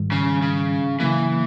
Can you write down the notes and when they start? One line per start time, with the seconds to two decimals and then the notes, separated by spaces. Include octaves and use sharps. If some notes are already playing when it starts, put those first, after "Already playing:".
Already playing: G#2 D#3 G3
0.12 C#3
0.42 C#3
1.00 C#3 E3 F#3 A#3